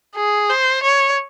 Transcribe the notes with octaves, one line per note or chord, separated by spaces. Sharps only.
G#4
C5
C#5